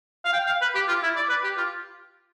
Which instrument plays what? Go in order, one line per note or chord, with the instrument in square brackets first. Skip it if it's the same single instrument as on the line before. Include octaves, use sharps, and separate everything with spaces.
[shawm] F5
G5
F5
B4
G4
F4
E4
D5
B4
G4
F4